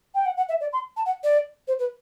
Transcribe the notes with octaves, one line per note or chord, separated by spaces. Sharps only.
G5
F#5
F#5
E5
D5
C6
A5
F#5
D5
C5
B4